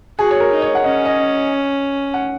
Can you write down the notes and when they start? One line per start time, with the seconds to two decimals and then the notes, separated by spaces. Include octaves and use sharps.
0.19 F#4 G#4
0.31 C#5
0.40 A#4
0.51 D#4
0.62 C#5
0.75 F#5
0.84 C#4 D#5
1.05 D#5
2.14 F#5